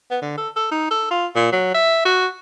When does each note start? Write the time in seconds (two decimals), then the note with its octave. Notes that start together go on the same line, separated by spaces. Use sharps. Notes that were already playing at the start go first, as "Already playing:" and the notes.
0.11 B3
0.22 D3
0.38 A4
0.56 A4
0.72 D#4
0.91 A4
1.11 F4
1.36 A#2
1.52 F#3
1.74 E5
2.05 F#4